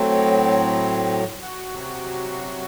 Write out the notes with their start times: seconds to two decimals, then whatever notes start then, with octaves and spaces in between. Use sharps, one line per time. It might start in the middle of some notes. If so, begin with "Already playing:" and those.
Already playing: A2 F#3 C4
1.42 F#4
1.72 C3 F#3